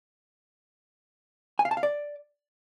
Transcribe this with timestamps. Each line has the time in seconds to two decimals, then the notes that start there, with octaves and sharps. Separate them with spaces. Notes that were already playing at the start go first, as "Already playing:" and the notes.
1.59 G#5
1.65 F5
1.71 A5
1.77 F5
1.83 D5